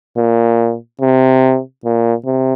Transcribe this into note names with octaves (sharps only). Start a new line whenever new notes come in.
A#2
C3
A#2
C3